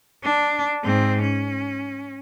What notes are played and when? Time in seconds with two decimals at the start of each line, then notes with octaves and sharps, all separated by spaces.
0.24 D4
0.84 G#2 C4
1.22 C#4